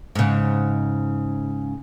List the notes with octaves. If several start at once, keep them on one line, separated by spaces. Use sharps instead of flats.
G#2 C#3